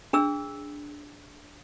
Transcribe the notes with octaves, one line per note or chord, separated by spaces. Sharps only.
D4 G#4 E6